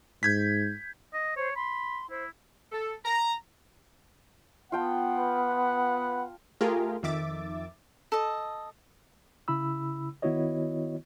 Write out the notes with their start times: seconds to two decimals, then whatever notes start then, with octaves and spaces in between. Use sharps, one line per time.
0.23 G#2 G6 G#6 B6
1.14 D#5
1.37 C5 C#5
1.56 B5 C6
2.10 E4 C5
2.72 A4
3.05 A#5
4.72 B3 F4 F#5 G5 A5
5.19 B4
6.61 A3 F4 G4 G#4 A#4
7.03 F2 D#3 E5 D6 A6
8.12 A4 D#5
9.48 C#3 E4 B5 E6
10.22 D#3 B3 E4 F#4 C#5 D#5